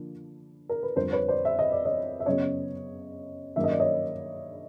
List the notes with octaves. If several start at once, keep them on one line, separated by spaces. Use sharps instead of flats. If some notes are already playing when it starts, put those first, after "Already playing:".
Already playing: D3 F3 A#3 D4
A#4
B4
F2 D3 G3 A#4 C5
B4 C#5
C5 D5
E5
D#5
D5
C#5 D#5
E5
F#2 C#3 F#3 B3 C#5 D#5
G2 D#3 F#3 A#3 C#4 E5
D#5
D5
C#5 D#5